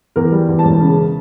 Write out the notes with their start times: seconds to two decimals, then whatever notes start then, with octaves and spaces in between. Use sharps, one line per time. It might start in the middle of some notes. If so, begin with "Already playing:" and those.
0.16 E2 A#4
0.32 G3
0.49 E2
0.59 A5
0.65 E1
0.80 C#3